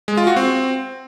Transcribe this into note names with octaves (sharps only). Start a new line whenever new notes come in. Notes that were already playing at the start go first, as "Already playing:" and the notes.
G#3
F4
F#4
C4